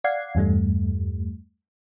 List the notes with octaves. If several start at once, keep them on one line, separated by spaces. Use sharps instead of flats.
D5 F5 F#5 G#6 C7
E2 G2 G3 A3